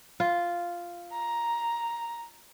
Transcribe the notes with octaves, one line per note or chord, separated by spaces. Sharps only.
F4
A#5